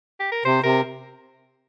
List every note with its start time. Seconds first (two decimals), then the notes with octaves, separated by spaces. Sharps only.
0.20 G4
0.32 A#4
0.45 C3 C5
0.63 C3 A#4